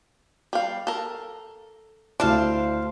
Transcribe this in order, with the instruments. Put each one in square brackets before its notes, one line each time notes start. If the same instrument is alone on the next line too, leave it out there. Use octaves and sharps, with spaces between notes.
[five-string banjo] G3 F5
A4 A#4
[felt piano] D2 E4 [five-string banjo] D4 [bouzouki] C5 F5